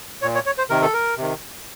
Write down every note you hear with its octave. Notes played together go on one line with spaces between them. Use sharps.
A#2 C#5
C#5
C#5
C5
C3 D#3 A#4
A4
A#4
C3 D#3